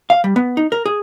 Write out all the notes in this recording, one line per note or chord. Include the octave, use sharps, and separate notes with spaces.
F5
G3
B3
D#4
A#4
G#4